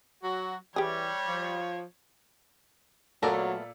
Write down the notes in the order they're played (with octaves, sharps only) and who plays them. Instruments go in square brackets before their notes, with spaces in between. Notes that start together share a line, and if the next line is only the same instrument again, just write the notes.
[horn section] F#3 F#4
[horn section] E3 [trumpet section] G3 [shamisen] G4 G#4 [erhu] C#5
[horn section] F3
[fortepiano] A#2 A4 D5 [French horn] F#3 [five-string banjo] A3 B3 A#4